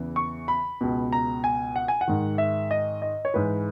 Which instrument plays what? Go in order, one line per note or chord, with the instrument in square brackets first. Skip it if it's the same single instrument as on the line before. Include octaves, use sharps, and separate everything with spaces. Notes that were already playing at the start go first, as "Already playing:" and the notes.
Already playing: [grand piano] E2 C#3 E3
C#6
B5
C#2 B2
A#5
G#5
F#5
G#5
F#5
G#2 D#3
E5
D#5
D#5
C#5
G#2 E3 B4